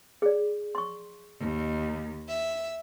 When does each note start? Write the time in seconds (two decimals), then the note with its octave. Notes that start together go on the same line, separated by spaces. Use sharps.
0.22 G#4 D5
0.75 C6 C#6
1.41 D#2
2.27 E5